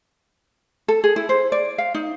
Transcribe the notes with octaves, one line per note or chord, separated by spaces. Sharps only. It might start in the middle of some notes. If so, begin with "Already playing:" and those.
A4
G#4
E4
C5
D5
F5
D#4